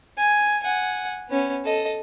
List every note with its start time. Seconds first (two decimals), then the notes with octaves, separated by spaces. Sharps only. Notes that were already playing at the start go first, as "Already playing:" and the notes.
0.18 G#5
0.63 F#5 G#5
1.29 B3 C#4
1.65 A4 D#5